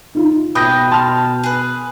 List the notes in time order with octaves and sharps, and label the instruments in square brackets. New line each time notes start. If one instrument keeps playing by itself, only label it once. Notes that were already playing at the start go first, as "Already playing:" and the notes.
[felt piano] D#4 F4
[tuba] B2 [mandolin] B4 D#5 G5 [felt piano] D#6 G6 A#6
[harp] A5 F6 [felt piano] C6
[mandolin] G#4 B4